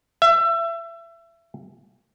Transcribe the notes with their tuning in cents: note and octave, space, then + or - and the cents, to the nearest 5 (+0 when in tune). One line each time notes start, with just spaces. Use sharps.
E5 +30